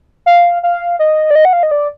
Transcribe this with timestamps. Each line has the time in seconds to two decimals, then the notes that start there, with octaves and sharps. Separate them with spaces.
0.26 F5
0.63 F5
0.99 D#5
1.31 D5
1.35 D#5
1.45 F#5
1.53 F5
1.63 D#5
1.71 D5